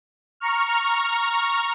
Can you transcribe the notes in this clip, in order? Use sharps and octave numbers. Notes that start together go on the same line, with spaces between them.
A#5 C#6 F6